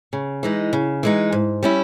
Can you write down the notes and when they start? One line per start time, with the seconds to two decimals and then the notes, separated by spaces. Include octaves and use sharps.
0.13 C#3
0.43 E3 G#3 D#4
0.73 C#3
1.03 E3 G#3 D#4
1.32 G#2
1.63 G3 C#4 E4